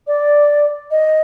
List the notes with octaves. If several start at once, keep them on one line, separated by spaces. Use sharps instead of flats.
D5
D#5